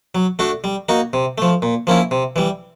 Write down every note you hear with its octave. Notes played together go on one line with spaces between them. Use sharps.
F#3
A3 D4 F#4
G3
A#3 D#4 F#4
C3
F3 A3
A#2
F3 A#3 C#4 E4
C3
E3 G3